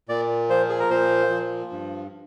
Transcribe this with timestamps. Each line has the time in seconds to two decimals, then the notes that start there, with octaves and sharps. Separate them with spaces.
0.09 A#2 D5
0.50 F3 C5
0.69 G#4
0.80 A#4
0.89 A#2 C5
1.30 F3
1.71 G2